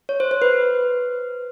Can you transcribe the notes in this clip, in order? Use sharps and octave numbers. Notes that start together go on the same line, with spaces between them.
C#5
C5
C5
B4